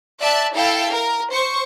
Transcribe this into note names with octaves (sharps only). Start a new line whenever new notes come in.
D5 E5 A5 F#6
E4 A4 F5 G5
A#4
C5 C#6